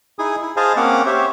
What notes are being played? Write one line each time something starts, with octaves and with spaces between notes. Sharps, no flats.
D#4 E4 G#4 G#5 D#6
E4
G#4 C5 D#5 F5 G#5 A5
A#3 C4 C#4 F5 F#5 D6
G4 C5 C#5 E5